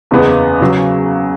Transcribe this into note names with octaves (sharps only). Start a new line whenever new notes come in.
F#1 E2 C#3 G#3 B3
C#3 F#3